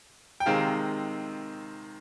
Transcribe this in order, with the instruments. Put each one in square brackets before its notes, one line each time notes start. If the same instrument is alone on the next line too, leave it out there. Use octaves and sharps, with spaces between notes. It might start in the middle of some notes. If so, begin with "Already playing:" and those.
[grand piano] G5
C3 D#3 G#3 C4 F5